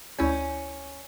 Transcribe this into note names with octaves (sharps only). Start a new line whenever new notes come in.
D2 C#4 E4 G6